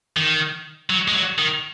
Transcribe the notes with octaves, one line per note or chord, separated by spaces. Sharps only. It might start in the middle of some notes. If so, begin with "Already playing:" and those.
D#3
F#3
G#3
F#3
D#3